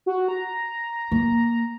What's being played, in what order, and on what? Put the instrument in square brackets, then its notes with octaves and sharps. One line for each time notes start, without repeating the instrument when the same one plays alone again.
[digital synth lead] F#4
A#5
[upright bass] A#3